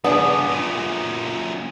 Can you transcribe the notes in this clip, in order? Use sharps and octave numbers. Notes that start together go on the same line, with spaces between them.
G2 C#3 B3 D4 G#4
F#2 A#2